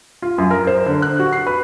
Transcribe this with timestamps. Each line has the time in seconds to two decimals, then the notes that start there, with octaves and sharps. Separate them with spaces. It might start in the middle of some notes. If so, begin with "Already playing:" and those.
0.22 F4
0.38 F#2
0.51 A#4
0.67 C5
0.86 D3
1.02 F#6
1.19 F#4
1.33 C7
1.47 B4